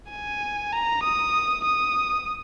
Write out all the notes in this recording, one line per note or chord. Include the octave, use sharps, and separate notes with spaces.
G#5
A#5
D#6
D#6